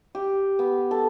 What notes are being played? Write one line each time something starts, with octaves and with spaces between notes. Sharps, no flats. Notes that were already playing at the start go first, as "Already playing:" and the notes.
G4
B3
A4